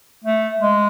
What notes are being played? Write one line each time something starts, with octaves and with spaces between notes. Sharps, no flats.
A3
G#3